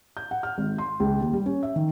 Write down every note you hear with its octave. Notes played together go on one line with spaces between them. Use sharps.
G6
F#5
F6
G#1
C6
C#2
D#2
G3
C#4
E5
D#3